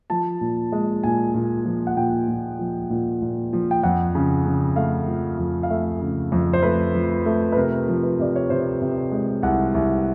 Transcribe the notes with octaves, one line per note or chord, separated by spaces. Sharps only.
F3 A5
A#2
G#3
A#2 G#5
A#2
F3
F#5
A#2 G5
A#2
F3
A#2
A#2
F3
G5
F2 F#5
C#3
C#3
A3 F5
F3
F2
F5
A3 E5
C#3
F2
C5
A3 B4
F3
A3
B4
C3 A#4
F3
B4
C3 D5
C#5
C3 C5
C3
G#3
C2 F#5
C2